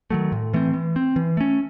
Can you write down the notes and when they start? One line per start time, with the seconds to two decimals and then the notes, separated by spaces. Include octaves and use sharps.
0.10 D#3 F#3 A3
0.32 A2
0.54 E3 A3 C4
0.74 E3
0.96 C4
1.16 E3
1.37 A3 C#4